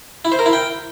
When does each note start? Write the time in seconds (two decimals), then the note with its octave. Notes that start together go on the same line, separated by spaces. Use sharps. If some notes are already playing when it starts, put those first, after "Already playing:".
0.25 E4
0.32 C5
0.39 A#4
0.46 E4
0.53 G5